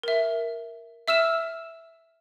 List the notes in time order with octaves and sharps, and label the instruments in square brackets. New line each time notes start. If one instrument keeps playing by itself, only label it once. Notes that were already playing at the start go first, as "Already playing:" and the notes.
[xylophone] A#4 E5
E5 E6 F6 E7